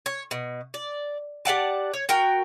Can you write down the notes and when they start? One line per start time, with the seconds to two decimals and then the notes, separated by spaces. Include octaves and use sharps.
0.06 C#5
0.31 B2
0.74 D5
1.45 G4 D5 F#5 A5
1.94 C#5
2.09 F#4 A#4 G5